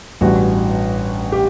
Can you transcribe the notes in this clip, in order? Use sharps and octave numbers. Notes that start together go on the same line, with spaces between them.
A1 G2 E3 G3 F#4
G4